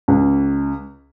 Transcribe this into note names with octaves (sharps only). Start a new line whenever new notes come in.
C#2